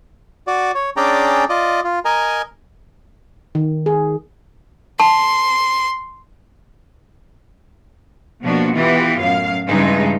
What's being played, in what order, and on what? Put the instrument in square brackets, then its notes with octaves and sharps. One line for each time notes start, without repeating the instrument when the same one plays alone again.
[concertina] F#4 D5
C#5
C#4 D4 G#4 D5 G5 A#5
F4 D5 D#5
F4
A#4 D#5 G#5 A#5
[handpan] D#3
G#4
[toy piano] A5 [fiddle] C6
[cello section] B2 F3 A#3 D4 F#4
E3 B3 F4 G4
F#2 A2 F5
G2 C#3 E3 G#3 D#4